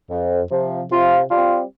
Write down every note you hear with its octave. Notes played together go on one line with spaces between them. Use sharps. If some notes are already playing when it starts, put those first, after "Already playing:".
F2
C3 F3
C3 F4
G3 F4
C4